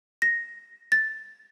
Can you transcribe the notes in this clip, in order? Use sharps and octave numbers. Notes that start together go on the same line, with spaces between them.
A#6
A6